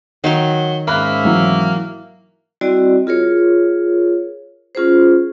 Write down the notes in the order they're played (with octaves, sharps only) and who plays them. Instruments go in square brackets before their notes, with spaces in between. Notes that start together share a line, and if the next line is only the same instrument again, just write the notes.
[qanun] D#3 D#4 F5 [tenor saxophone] F#3
[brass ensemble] G#2 C#4 E5 [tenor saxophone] A#3 [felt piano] B5 F#6
[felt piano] E3 F#3
[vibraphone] G3 C4 E4 F#4 D5 D#5
F4 G#4 A#4 C#5
C#4 F4 G#4 C5